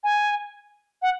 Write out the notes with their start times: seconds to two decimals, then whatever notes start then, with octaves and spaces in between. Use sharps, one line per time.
0.04 G#5
1.02 F#5